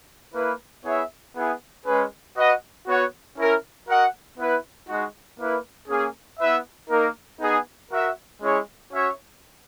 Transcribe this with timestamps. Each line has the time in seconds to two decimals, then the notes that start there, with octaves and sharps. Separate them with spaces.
0.34 A#3 E4 B4
0.85 B3 E4 G#4 C#5 E5
1.35 B3 E4 G#4
1.86 G#3 C#4 G#4 B4
2.36 F#4 B4 D#5 F#5
2.86 B3 F#4 C#5 F#5
3.37 C#4 E4 A#4
3.88 F#4 A#4 D#5 F#5
4.38 B3 E4 B4
4.88 G#3 D#4 F#4
5.39 A#3 E4 B4
5.89 A#3 C#4 G#4
6.39 B3 E4 B4 E5
6.90 A#3 D#4 A#4
7.40 B3 D#4 G#4
7.91 F#4 A#4 E5
8.41 G#3 C#4 E4 G#4 C#5
8.91 C#4 F#4 C#5 E5